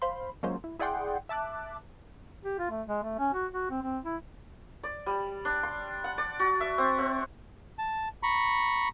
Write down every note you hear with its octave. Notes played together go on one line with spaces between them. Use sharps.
C5 F5 B5 C6
F#3 G#3 A#3 C#4 F4 C5
E4
E4 G#4 D5 F#5 G5 C6
E5 A5 D6 F#6
G4
F4
A3
G#3
A3
C#4
F#4
F#4
C4
C4
E4
D5
G3
D4
C6
F#5
D5
F#4
E5
C4
C4
A5
A#5 B5 C#6